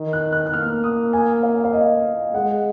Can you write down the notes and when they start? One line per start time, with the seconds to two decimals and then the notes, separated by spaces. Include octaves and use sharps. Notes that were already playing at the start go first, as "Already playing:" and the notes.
Already playing: D#3
0.13 F#6
0.32 F#6
0.46 F#6
0.53 A#3 F6
0.84 D#6
1.13 G#5
1.43 F5
1.64 F5
1.73 D#5
2.34 G#3 F#5